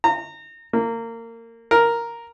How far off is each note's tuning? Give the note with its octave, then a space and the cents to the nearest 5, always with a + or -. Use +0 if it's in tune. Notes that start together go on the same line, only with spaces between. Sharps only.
A#5 -30
A#3 -25
A#4 +0